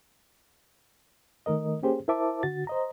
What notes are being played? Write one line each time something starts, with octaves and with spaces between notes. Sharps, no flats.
D#3 A3 A#4 D#5
A#3 C#4 G4 G#4 C5
E4 A#4 C5 E5 A5 D6
D3 F#4 A6
C5 D#5 A#5